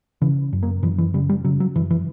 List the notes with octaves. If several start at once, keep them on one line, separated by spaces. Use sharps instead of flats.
C#3 E3
F#2
A#3
F#2 E3
E3
C#3 G3
G3
C#3 F#3
F#3
F#2 E3
E3